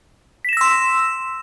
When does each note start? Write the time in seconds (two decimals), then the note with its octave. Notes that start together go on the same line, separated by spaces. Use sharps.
0.45 B6
0.49 E7
0.53 A#6
0.57 E6
0.61 C6